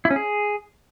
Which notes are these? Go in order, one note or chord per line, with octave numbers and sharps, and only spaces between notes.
E4
C#4
G#4